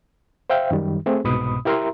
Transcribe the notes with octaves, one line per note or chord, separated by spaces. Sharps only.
C5 E5 F5 G5
F#2 D#3 G3
A3 C4 G#4
C2 G#2 B2 B5 D#6
E4 G4 A#4 E5 A#5 C6